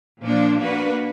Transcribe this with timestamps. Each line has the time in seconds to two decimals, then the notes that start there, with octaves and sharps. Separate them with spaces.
0.23 A#2 F3 A#3 D4
0.60 A#3 D4 F#4 B4